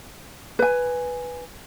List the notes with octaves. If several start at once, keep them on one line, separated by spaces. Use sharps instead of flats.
B4 G#5